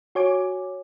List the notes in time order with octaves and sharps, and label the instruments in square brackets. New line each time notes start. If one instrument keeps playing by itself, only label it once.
[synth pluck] F#4 C#5 G#5 D6